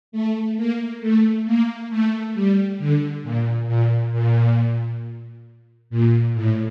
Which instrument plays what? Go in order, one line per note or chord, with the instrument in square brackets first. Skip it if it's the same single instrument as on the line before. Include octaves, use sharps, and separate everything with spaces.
[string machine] A3
A#3
A3
A#3
A3
G3
D3
A#2
A#2
A#2
A#2
A2